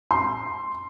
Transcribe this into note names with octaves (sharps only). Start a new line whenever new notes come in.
C6